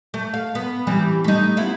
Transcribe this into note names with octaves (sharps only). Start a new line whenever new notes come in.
A3
F5
B3
E3 G3 C4
A3 D#4
B3 E4 F4